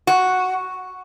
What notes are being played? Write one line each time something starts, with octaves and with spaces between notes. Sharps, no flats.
F#4